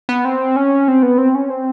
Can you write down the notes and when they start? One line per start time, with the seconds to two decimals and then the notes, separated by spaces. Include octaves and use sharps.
0.09 B3
0.25 C4
0.56 C#4
0.88 C4
1.03 B3
1.18 C4
1.35 C#4
1.50 C4